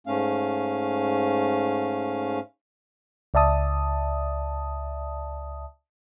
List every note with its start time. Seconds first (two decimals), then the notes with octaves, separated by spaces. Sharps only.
0.07 G#2 A3 C#4 F5
3.34 C#2 D5 E5 A5 D#6